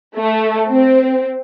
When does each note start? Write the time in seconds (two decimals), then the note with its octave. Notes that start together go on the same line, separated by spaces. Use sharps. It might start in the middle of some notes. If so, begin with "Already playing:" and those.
0.17 A3
0.70 C4